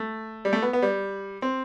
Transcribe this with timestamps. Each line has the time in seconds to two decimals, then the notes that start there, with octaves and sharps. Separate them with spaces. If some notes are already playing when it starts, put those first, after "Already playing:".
Already playing: A3
0.45 G3
0.53 A3
0.62 B3
0.73 B3
0.82 G3
1.42 C4